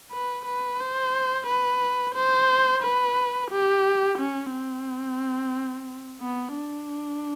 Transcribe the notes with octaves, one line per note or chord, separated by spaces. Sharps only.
B4
B4
C5
B4
C5
B4
G4
C#4
C4
B3
D4